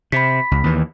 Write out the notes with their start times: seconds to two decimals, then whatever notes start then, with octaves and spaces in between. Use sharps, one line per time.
0.12 C3 B5 B6
0.51 C#2
0.64 D#2 E3